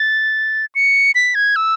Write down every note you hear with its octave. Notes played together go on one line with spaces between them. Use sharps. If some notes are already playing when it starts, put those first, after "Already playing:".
Already playing: A6
C#7
B6
G#6
E6